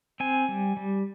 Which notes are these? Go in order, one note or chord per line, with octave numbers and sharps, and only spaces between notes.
C4 G#5
G3
G3